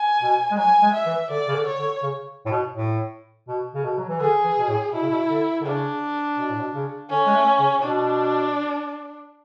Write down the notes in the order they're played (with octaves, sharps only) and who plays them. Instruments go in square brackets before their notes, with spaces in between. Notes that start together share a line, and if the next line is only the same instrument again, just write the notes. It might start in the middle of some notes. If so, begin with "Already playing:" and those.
Already playing: [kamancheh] G#5
[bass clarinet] B2
G#3
[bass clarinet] F#3 [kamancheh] G#5
[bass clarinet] G#3
[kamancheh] E5
[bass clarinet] E3
[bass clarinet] D3 [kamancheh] D5
[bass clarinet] C#3
D3
[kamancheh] C#5
[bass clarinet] D3
C#3
A2
B2
A2
B2
C#3
B2
F#3
E3
[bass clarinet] D3 [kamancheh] G#4
[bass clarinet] E3
B2
A2
[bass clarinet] B2 [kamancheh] E4
[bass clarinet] C#3
B2
D3
D3
[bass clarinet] C#3 [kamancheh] D4
[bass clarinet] B2
A2
B2
C#3
[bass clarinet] D3 [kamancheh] C#4
[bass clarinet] G#3
A3
C#3
[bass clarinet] B2 [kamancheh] D4